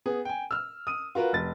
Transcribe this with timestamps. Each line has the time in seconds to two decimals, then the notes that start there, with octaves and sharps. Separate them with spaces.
0.06 B3 G#4
0.25 G5 G#5
0.51 E6 F6
0.87 D#6 D#7
1.15 F4 F#4 A#4 B4
1.33 F1 A6